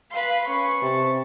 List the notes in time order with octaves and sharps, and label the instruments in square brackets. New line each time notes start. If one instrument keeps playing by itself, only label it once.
[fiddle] B4 C6 [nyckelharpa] F5
[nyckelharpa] C#4 B4 [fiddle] C#6
[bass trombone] C3 [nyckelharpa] A5